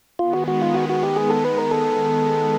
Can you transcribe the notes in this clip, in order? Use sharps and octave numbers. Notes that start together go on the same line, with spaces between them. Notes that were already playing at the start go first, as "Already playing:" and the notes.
D#3 G#3 B3 F4
F#4
F#4
F4
F#4
F#4
G4
G#4
A4
B4
A#4
A4